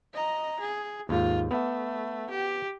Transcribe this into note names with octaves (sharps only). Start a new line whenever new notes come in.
D#5 A#5
G#4
D#2 G#2 F4
A3 B3
G4